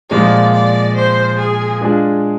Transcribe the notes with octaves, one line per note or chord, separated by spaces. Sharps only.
A#2 F3 G#3 D5
D5
C5
G#4
G#3 D4 F4 G#4